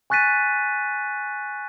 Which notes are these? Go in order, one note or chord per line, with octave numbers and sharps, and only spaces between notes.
G#5 C#6 F#6 A6 B6 D#7